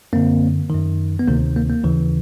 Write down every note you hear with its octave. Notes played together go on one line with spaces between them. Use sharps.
F#2 D3 A#3 C4
D#3
F#2
B3
D2 C3 D#3 A#3
A#3
A#3
D#2 C#3 E3